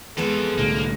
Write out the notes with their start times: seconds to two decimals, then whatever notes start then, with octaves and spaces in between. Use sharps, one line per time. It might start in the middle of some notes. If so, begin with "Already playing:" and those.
0.18 F2 G#3 B3 G#4 A4
0.58 C2 A2 D3 A#3